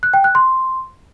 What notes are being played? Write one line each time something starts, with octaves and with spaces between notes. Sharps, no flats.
F#6
G5
F#6
C6